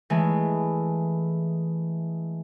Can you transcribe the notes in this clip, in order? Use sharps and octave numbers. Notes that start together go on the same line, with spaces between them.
E3 G#3 A3